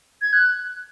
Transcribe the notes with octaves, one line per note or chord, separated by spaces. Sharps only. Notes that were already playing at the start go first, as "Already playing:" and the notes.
G#6
F#6